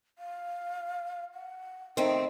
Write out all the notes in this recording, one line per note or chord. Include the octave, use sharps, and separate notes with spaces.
F5
F#5
D#3 A3 C4 D#4